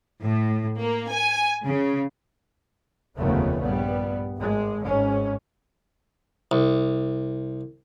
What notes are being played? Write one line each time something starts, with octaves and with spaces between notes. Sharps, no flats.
A2
A#3
G#5
C#3
F1 D#2 C#3 F3 A3 B3
A#1 G2 G3 B3
G#1 G#3
G#1 G#2 C#4
C2